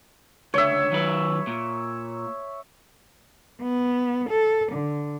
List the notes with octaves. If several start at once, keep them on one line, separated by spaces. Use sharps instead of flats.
C#2 D3 C#5 E5
D#3 F#3 B4
A#2
B3
A4
D3